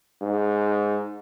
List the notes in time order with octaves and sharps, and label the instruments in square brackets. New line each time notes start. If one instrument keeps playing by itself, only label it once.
[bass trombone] G#2